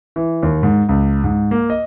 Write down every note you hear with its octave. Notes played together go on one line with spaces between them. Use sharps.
E3
D#2
G#2
C#2
G#2
A#3
D#5